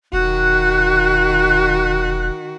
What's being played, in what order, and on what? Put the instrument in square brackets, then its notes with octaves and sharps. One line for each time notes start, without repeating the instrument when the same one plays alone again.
[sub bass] E1 [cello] D#3 F#4 [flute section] F#6